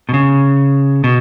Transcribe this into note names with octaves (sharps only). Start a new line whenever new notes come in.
B2
C#3
B2